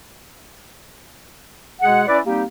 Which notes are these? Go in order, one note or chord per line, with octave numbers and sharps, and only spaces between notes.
B2 G#3 G#4 F#5
C#4 E4 B4 D5
G3 A#3 C4 D#4 G4